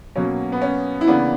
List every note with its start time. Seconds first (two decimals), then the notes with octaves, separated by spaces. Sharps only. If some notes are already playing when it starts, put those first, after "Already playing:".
0.16 B2 F#3 A#3 C#4
0.52 B3
0.62 C#4
1.01 E4
1.07 C#3 E3 A#3 B3 D4